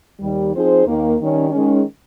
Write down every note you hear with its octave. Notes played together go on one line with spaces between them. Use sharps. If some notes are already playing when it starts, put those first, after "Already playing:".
D#2 D#3 G3
F3 C4 D#4 G#4 C5
D#2 D#3 A#3
D#3 G3 C#4
D#3 G#3 C#4